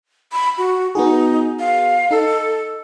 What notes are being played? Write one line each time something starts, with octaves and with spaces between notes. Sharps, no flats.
B5
F#4
B3 D#4 F#4 G#4
F5
D#4 A4